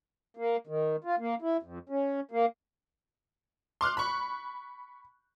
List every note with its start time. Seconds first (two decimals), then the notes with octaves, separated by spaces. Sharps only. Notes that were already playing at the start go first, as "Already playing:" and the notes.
0.37 A#3
0.67 D#3
1.04 F4
1.19 A#3
1.42 E4
1.63 F2
1.89 C#4
2.31 A#3
3.81 C6 D6 F6 F#6
3.97 B5 C#6